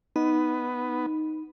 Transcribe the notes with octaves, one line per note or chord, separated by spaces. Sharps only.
B3 D#4